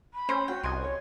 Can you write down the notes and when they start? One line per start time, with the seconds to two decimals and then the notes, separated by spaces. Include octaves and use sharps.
0.14 B5
0.29 C#4 C5
0.48 F#4 G5
0.63 C2 D#5 G#5 C6
0.82 C#5